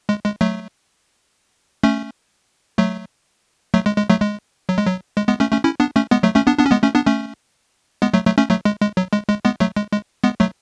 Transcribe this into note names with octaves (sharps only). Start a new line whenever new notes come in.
G#3
G#3
F#3 A3
A3 C#4
F#3 A3
F#3 A3
G#3
G#3
F#3 A3
G#3
F#3
G#3
F#3
G#3
G#3 B3
A3 C#4
A3 C#4
C#4 E4
B3 D4
A3 C#4
G#3 B3
F#3 A3
A3 C#4
B3 D4
B3 D4
C#4
G#3 B3
A3 C#4
B3 D4
A3 C#4
G#3 B3
F#3 A3
F#3 A3
A3 C#4
F#3 A3
G#3
G#3
F#3
G#3
G#3
G#3 B3
F#3 A3
G#3
G#3
G#3 B3
F#3 A3